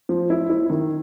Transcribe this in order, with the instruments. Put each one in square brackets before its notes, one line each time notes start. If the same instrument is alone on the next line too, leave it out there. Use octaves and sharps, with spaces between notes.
[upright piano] F3
E4
E4
D#3